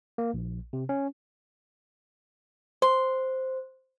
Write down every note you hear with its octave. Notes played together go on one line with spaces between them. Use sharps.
A#3
A#1
C3
C#4
C5 C6